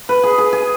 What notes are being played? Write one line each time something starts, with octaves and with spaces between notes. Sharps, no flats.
B4
G#4
G#4
G#4